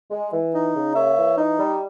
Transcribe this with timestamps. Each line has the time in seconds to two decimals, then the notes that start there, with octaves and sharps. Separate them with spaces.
0.11 G#3
0.32 E3
0.54 D#4
0.75 C#3
0.95 A#3 C#5 E5
1.16 E3
1.38 D#4
1.59 G3